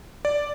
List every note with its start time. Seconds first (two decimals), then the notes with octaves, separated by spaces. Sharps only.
0.25 D5